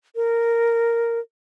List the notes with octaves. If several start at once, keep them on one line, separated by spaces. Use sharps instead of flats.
A#4